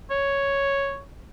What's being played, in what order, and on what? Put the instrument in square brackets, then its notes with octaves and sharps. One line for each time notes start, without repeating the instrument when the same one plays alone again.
[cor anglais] C#5